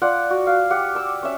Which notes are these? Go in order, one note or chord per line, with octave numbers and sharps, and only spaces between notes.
F4 D5 F#5
F#4
F5
G4 F#5
D6 E6
C#4 E5